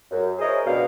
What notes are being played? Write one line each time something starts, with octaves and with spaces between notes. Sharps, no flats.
F#2
E4 G#4 A#4 C5 C#5 D#5
C#2 B2 B3 D4 F5